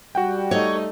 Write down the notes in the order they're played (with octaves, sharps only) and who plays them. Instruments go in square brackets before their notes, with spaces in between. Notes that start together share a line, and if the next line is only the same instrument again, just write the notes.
[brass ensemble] G3 [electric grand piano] F#4 F#5 G5
[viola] A3 D#4 [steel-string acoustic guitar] C#5 D#5